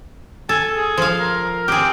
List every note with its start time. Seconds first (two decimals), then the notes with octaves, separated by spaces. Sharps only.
0.49 A4 G#5
0.76 G#4
0.98 F3 F5
1.20 A#4
1.68 C4 G4 G#4